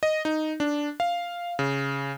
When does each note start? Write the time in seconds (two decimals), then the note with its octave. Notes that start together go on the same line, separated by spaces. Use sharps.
0.03 D#5
0.25 D#4
0.60 D4
1.00 F5
1.59 C#3